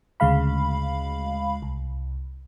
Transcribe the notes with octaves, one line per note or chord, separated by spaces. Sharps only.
D2 C#3 G#3 F5 B5
C2